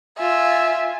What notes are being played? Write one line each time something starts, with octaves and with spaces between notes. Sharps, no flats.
F4 E5 G#5